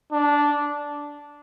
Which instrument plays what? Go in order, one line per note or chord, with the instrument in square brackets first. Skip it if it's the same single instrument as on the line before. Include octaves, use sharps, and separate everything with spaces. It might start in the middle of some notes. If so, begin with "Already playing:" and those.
[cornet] D4